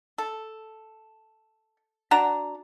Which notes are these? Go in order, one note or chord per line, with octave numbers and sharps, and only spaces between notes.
A4
D4 F#4 A#5